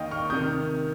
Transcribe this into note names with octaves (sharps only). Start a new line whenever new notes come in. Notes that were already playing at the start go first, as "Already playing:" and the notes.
Already playing: D#2 D#3 D#5 F5 G5
C#6 F6
C3 D#3 D#6 G6